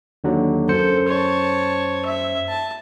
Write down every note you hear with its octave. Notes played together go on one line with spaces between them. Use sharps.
D#2 D3 F#3
F#2 A4 C5 C#7
C#5 A5
E5
A5